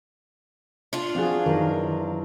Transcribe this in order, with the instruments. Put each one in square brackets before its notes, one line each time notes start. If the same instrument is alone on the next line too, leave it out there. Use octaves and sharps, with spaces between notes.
[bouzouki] D4 F4
[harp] F3 F#4 [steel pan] C4 G#4
[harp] F#2 E3 [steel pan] D#3 A#4